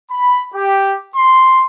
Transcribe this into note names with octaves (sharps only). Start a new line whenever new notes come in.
B5
G4
C6